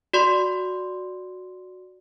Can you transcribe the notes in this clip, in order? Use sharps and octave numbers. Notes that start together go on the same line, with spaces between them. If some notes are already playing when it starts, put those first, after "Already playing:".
F#4 D5 C6